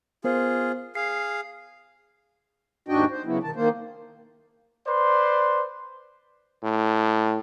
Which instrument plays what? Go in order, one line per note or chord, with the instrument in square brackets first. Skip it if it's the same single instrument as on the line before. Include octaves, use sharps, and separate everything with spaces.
[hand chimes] B3 A#4 C5 [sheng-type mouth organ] F4 G#4
[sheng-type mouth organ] G#4 F5 [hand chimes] C7
[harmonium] D#2 G#2 D4 F#4 D#5 G5
C5
C#3 F#3 B3 E4
B2 D#3 A5
D#3 A#3 C5
[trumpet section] B4 C5 D5 C6
[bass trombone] A2